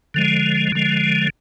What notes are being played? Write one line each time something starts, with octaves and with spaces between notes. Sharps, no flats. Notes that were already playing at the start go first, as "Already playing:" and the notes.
D3 F3 G#3
D3 F3 G#3